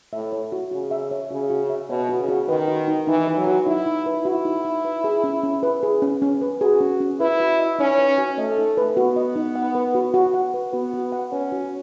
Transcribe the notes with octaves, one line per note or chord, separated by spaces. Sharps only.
A2 E5
C#5
F#4
C#3 F#4
E5
C#5
C#3 F#4
F#4
E5
B2 C#5
F#4
C#3
F#4
D#3 B4
F#4
D#4
E3 D#4
B4
F#3
F#4
D#4 E4
D#4
B4
E4 F#4
D#4
D#4
B4
G#4
C#4
C#4
B4
G#4
C#4
C#4
B4
F#4 G#4
C#4
C#4
E4 B4
F#4
D#5
C#4 D#4
B4
F#4
A3 D#5
D#4
B4
B3 F#4
D#5
D#4
F#5
B4
F#4
F#4
F#5
B4
B3 F#4
F#4
F#5
C#4 B4
F#4